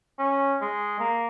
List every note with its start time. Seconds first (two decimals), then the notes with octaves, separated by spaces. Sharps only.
0.19 C#4
0.61 G#3
1.00 A#3